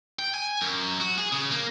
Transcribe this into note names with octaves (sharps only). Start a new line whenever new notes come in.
G5
G#5
F#2
F#4
G#4
C#3
A#3